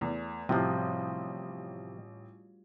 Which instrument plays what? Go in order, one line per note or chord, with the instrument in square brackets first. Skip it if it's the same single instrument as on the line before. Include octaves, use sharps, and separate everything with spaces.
[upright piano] E2 [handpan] A3
[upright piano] A1 [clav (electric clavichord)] C3 F3 [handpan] G3 F4 F#4